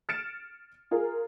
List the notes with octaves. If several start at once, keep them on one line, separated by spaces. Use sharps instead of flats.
F6 A6 C#7 D7 E7
F4 G#4 A#4